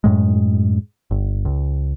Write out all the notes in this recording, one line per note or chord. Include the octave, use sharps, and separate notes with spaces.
F#2 A2 G#3
G1
C#2